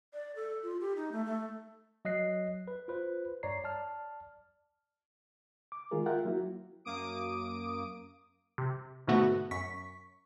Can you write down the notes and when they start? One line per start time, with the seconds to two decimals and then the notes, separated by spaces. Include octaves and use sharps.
0.14 D5
0.36 A4
0.63 F4
0.81 G4
0.96 D#4
1.12 A3
1.25 A3
2.05 F#3 D#5 F#6 C7
2.68 B4
2.88 F4 B4 C5
3.43 G2 C#5 D5 A#5 C7
3.64 D5 A5 F6
5.72 D6
5.91 D#3 G#3 F4 G#4 A#4
6.06 F4 A#4 E5 F#5 G5
6.25 F#3 A#3 E4 F#4
6.85 F#2 A#3 D6 D#6 D7
8.58 C3
9.07 G#2 B2 D3 A3 B3 F#4
9.51 F#2 C#6 B6